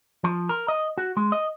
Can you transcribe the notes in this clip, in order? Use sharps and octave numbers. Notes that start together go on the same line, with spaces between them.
F3
A#4
D#5
F#4
G#3
D#5